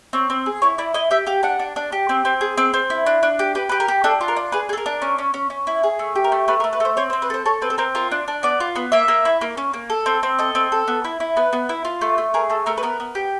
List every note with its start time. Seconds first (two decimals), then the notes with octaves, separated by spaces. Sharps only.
0.13 C4 C#5
0.30 C4
0.46 G#4
0.62 E4 C#5
0.78 E4 D5
0.94 E4 D#5
1.11 G4 E5
1.26 G4 F5
1.43 D4 F#5
1.59 D4
1.76 D4
1.92 G4
2.09 C4
2.25 C4
2.41 G#4
2.57 C4
2.74 C4
2.90 E4
3.06 D4
3.23 D4
3.39 G4
3.55 G4 B4
3.69 G4 B4
3.80 A#4
3.88 G4
4.04 D4 A4
4.21 F4
4.28 A#4
4.36 D4
4.52 G#4 B4
4.69 G#4 A4
4.77 A#4
4.86 D4
5.02 C#4
5.18 C#4
5.34 C#4
5.50 C#4
5.67 E4
5.83 G#4
5.99 A3
6.16 G4
6.24 A#4
6.32 A3
6.48 A3 B4
6.60 A#4
6.64 A3
6.73 B4
6.80 A3 C5
6.97 C4 C#5
7.10 C5
7.13 C4
7.22 B4
7.30 A4 C5
7.46 A4 C#5
7.62 C4 B4
7.70 A4
7.78 C4 A#4
7.95 F4 A#4
8.11 D4
8.28 D4
8.43 B3 D5
8.60 F4
8.76 B3
8.92 A#3 E5
9.08 A#3
9.25 E4
9.41 A#3
9.57 C#4
9.73 A#3
9.90 A4
10.06 C4
10.23 C4
10.39 A4 D#5
10.55 C4
10.72 A4
10.88 B3
11.05 E4
11.20 E4
11.37 B3 B4
11.53 B3
11.69 E4
11.85 F4
12.01 A3
12.18 A3
12.34 G#4 A#4
12.50 A3 A4
12.66 A3 A#4
12.77 B4
12.83 B3 A#4
13.00 B3
13.15 G4